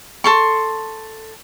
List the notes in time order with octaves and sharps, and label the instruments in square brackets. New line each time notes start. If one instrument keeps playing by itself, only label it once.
[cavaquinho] A4 C6 C#6